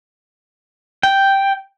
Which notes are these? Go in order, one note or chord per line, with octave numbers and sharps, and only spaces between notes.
G5